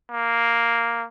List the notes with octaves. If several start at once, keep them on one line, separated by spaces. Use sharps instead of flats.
A#3